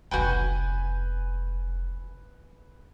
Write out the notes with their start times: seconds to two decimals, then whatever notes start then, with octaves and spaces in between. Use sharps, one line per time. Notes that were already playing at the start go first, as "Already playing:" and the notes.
0.11 F1 B1 D4 F#4 B4 G5 G#5 G6